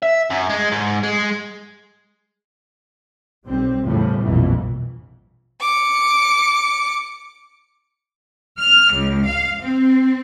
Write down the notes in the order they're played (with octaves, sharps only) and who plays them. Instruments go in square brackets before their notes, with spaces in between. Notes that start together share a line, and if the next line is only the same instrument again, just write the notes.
[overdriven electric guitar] E5
F#2
G#3
G#2
G#3
[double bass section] B1 G3 C4
E2 A2 C#3 F3 G3
A#1 F2 B2 E3
[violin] D6 C#7
[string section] F6
C#2
F5
C4